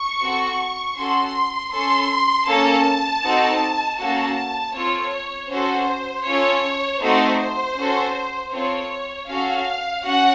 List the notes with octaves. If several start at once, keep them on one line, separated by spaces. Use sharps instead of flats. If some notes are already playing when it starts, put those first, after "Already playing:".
Already playing: C#6
C4 F#4 A4
C#4 F#4 A4 C6
C#4 A4 C6
A#3 C#4 A4 A5
C4 D#4 F#4 A4
A#3 C#4 F#4 A4 A5
C4 F4 A4 C#5
C#4 F#4 A4 C5
C#4 F4 A4 C#5
A3 C4 D#4 F#4 A4 C5
C#4 F#4 A4
C4 F4 A4 C#5
C#4 F#4 A4 F5
C#4 F#4 F#5